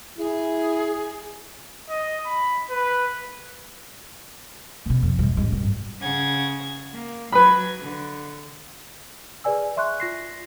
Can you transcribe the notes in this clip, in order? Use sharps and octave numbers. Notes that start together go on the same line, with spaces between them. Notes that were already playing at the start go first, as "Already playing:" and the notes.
E4 G#4
D#5
B5
B4
B1 B2
F2
F3 G#3
A1 G#3
G#1 G2
C#3 F#5 G#6
A#3
F#3 B4 B5 G#6
D3
G#4 B4 D5 G#5 E6
D5 E5 C6 C#6 F#6
F4 A#6 C7